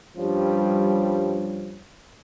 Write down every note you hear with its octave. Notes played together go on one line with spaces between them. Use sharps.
G2 F3 G3 C#4